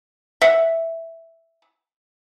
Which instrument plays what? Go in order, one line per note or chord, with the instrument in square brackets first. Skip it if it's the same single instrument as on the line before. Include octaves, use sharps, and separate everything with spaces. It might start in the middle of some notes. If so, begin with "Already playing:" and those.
[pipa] E5 F#5